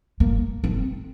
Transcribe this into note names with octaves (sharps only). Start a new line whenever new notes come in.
A#3
C4